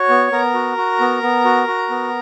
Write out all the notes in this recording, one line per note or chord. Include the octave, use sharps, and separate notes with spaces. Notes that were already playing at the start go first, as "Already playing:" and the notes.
Already playing: F#4 C#5 C#6
B3
B3 A#4 A#5
F#4
F#4
B3
B3
F#4
F#4
B3